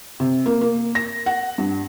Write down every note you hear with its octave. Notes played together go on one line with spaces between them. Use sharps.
C3
A#3
A#3
A#6
F#5
G2